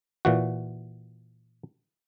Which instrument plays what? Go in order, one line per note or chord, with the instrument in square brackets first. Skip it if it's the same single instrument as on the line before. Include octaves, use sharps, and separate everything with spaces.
[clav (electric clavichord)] A#2 E3 F#4